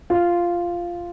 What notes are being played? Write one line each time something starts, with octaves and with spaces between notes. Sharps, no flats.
F4